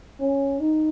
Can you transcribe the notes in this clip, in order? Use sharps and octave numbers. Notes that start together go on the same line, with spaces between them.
C#4
D#4